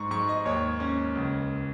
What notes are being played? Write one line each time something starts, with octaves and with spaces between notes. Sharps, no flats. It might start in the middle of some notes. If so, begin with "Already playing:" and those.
Already playing: G#2 G#3 C#6
G#2 C#6
D#5
D#2 C#5
C#4
C#2